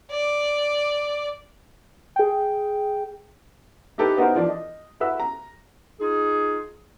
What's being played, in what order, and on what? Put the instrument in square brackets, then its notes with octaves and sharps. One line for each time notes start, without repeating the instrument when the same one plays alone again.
[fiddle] D5
[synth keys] G#4 G5
[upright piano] D#4 E4 G4 A4 B4
B3 D#4 E4 F#4 A#4 C5
E3 F3 D4
D#5
E4 F#4 B4 E5 E6
A#5
[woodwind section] D#4 F4 G#4